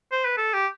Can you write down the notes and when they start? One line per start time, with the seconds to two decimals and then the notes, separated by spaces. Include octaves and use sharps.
0.12 C5
0.25 B4
0.37 A4
0.54 G4